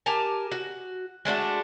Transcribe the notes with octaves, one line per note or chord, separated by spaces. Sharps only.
G4 A#4 G#5 A5
F#4
G#3 A3 D4 F#4